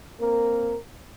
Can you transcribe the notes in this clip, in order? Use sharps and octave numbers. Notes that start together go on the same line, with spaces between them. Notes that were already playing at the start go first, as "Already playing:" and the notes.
A#3 C4 A#4